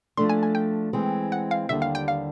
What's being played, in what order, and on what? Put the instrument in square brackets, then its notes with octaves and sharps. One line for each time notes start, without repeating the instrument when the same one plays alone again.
[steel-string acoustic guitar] F3 A3 D4 [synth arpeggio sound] C6
[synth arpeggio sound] G#5
G#5
G5
[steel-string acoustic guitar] E3 G#3 C4
[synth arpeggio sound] F#5
F5
[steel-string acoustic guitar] D#2 D3 G3 [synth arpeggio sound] E5
[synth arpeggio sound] F5
G5
F5